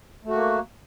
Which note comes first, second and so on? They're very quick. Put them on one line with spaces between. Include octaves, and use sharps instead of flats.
A3 F#4 A#3